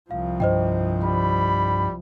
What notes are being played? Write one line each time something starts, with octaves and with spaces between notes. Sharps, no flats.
C2 F3 F5
G2 C5 D#5 G5
G3 B5